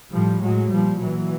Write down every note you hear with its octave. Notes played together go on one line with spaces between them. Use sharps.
A2 F3 G3
A2 F#3 G#3
A#2 F3 G3
A#2 E3 F#3